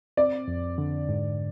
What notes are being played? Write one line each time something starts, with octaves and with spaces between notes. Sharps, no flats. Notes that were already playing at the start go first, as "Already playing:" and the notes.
C4 D5
F2
D3
G#2